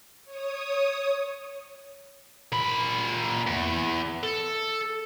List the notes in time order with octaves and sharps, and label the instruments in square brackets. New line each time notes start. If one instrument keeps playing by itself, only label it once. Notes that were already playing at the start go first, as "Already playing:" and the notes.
[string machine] C#5 D#6
[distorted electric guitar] A#2 B5
E2
A4